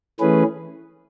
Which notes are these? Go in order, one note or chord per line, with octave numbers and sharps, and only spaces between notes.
E3 A3 C#4 G#4 B4